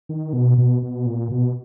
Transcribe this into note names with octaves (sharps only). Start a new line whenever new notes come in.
D#3
B2
B2
B2
A#2
B2